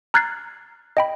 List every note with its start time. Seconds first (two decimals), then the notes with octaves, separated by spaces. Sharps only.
0.14 A#5 F6 F#6 G#6 A6 C7
0.97 D#5 G5 B5